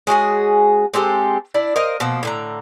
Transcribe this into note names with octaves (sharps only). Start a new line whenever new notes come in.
G#3 C#4 F#4 G#4
G#3 C4 G4 A4
D4 E4 D5
A#4 C5 D#5 F5
B2 F3 A#3
A2 D3 A#5